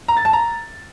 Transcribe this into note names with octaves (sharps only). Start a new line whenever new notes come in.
A#5
A6
A5
A#5